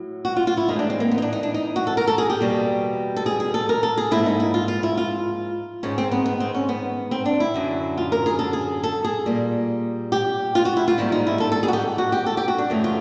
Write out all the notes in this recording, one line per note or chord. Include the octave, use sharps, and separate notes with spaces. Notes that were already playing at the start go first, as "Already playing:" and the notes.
Already playing: A2 F#3
F#4
F4
F4
E4
A2 E3 G#3 D#4
D4
C4
A#3
B3
D#4
D4
D#4
D4
D#4
F#4
A4
A#4
A4
G#4
G4
E2 B2 G3 A#3
A4
G#4
G#4
A4
A#4
A4
G#4
G#2 F3 A#3 E4
D#4
E4
F4
F4
E4
F4
G#2 D#3 G#3 C#4
C4
B3
B3
C4
C#4
B3
C4
D4
E4
F#2 D3 F#3
F4
A#4
G#4
A4
G#4
A4
G#4
A#2 G3 A#3
G4
F4
F#4
E4
F4
G#2 D#3 G3 A#3 E4
D#4
E4
A4
A4
G#4
F#4
G4
F#4
G4
A4
G4
F#4
D4
F#2 C#3 E3 A3
F4